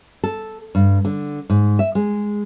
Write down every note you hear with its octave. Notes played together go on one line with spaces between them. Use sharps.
A4
G2
D3
G#2
E5
G#3